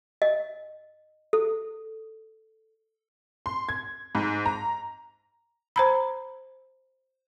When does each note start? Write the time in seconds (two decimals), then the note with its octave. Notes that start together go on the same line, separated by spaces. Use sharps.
0.22 D#5
1.33 A4
3.46 C6
3.69 G#6
4.15 G#2
4.46 A#5
5.76 C5 A#5 B5